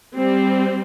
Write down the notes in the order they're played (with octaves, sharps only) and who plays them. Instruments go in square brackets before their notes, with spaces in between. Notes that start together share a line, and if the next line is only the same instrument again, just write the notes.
[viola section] G3 C4